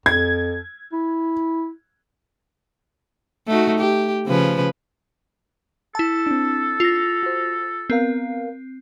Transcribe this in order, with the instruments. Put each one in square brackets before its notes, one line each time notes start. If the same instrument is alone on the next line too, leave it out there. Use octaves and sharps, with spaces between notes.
[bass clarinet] F2 [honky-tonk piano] G#6
[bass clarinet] E4
[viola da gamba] A3 D#4 F#4
G4
C#3 F3 B4
[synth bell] E4 A5 [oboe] A4
[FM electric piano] C4 D4
[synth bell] F4 A#6
[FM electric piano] F#4 C5
[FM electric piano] B3 A#4 F5 [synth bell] C4